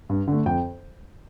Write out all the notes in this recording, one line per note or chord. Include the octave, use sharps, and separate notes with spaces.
G2
D3 A3
F2 G5